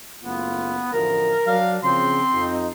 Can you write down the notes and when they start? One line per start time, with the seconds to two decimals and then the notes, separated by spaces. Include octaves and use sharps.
0.23 F#1 A3 B3 F4
0.93 A1 D2 F3 A#4
1.47 F#3 D4 F5
1.84 C#3 F3 C4 C6
2.34 F2 D#4